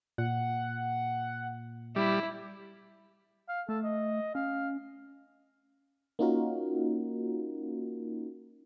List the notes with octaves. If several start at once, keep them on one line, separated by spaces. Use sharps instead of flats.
A#2 F#5
G3 E4
F5
A3 A4
D#5
C#4 F5
A#3 C#4 D#4 F4 F#4 A#4